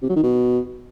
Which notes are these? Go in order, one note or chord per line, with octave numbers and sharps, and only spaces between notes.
C3
F#3
D#3
B2